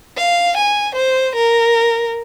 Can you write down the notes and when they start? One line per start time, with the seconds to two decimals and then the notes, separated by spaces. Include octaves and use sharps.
0.17 F5
0.57 G#5
0.95 C5
1.35 A#4